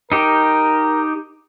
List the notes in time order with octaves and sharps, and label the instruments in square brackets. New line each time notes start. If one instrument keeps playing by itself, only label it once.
[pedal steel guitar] D#4 G4 [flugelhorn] A#4